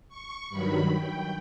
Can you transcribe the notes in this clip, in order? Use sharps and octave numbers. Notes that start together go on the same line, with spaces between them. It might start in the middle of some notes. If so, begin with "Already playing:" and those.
C#6
G2 D#3 F#3 B5
G5